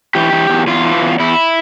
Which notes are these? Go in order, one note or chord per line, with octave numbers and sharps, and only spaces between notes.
E3 G4
E3
E2
E2 F4
E3
E2
E2 E4